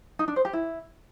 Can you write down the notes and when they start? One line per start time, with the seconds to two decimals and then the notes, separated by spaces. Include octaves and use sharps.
0.19 D#4
0.28 D4
0.36 C5
0.45 G4
0.53 E4